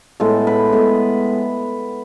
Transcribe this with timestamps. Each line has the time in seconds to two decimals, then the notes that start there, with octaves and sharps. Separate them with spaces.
0.20 A2 G#3 B3 A4
0.47 B4
0.72 A2 G#3 B3